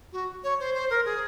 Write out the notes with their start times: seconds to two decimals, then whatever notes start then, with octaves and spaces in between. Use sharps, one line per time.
0.12 F#4
0.43 C#5
0.60 C5
0.74 C5
0.90 A#4
1.05 G#4